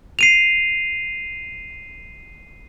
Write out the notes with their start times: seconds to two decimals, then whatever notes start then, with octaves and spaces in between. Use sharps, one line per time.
0.19 C7 D#7 F7